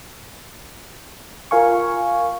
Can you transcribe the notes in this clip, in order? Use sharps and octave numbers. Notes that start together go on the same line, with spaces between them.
F4 A#4 F5 G#5 C#6